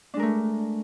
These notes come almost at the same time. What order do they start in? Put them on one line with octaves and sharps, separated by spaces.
D4 G#3 A#4 A3